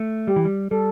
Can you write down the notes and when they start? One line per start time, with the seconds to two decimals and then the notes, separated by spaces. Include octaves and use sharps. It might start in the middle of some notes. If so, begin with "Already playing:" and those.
Already playing: A3
0.27 G3 G4
0.36 E3
0.45 G3
0.71 G3 A4